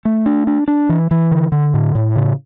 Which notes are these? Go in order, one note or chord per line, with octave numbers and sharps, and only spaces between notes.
A3
D4
D4
D4
E3
E3
D3
D3
A2
A2
C#3